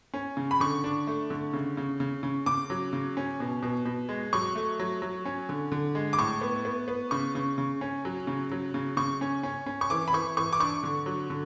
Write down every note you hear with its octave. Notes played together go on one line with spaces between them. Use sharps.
C#4
C#3
B5
D3 C#6
D4
A3
D3
C#3
C#3
C#3
C#3
C#3 D6
F#3
C#3
C#4
B2
B2
B2
G#3
F#3 C#6
A3
F#3
F#3
C#4
D3
D3
G#3
D6
A2 C#6
B3
B3
B3
C#3 C#6
C#3
C#3
C#4
F#3
C#3
F#3
C#3
C#3 C#6
C#4
C#4
C#4
C#6
E3 D6
B5
E3 C#6
E3 C#6
D6
D4 C#6
D3
F#3
D3